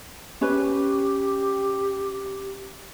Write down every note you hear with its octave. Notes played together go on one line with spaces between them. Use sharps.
C#4 G4 B4